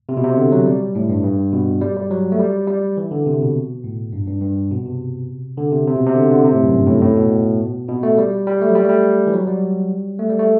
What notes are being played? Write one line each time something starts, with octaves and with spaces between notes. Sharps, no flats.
C3
B2
C3
D3
F#3
G3
A2
G2
G2
B2
G3
G3
F#3
A3
G3
G3
E3
D3
C3
B2
A2
G2
G2
G2
B2
C3
D3
C3
C3
B2
C3
D3
D3
C3
A2
F#2
G2
A2
A2
B2
B2
A3
G3
G3
A3
F#3
G3
A3
G3
E3
F#3
G3
A3
G3
A3